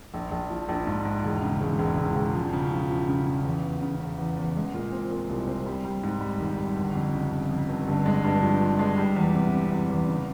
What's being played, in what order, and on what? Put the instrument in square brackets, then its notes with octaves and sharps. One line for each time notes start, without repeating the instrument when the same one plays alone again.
[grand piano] A#1
A#1
F3
A#1
G#2
G#2
E1
C#3
E1
E1
E1
E1
F3
C#3
F3
F3
C#3
C#3
E2
E2
C#3
E2
E2
E2
G#3
A#2
C4
A#2
C2
C4
G3
G3
G#2
G3
G#1
G3
G1
F2
C#3
G1
F2
G1
G2
G#3
G2
F3
F3
G#3
G3
E2
C3
C3
E2
E2
C#3